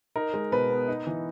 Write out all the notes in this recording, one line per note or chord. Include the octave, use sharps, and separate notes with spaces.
D#4 A#4
G#3
B2 B4
B3
D#4
E3